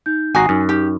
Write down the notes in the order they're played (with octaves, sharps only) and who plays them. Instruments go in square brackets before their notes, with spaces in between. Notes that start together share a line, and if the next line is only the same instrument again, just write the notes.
[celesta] D#4 G6
[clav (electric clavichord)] G#1 F#4 A#5 [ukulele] G#5 [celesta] D#6 C7
[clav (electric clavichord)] F#2 [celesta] D#4
[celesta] D#4 [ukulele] G4